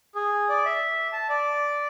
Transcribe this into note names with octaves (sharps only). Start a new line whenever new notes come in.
G#4
D5
E5
A5
D5